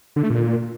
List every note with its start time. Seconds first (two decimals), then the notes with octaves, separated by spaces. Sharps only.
0.16 D3
0.23 A3
0.30 A#2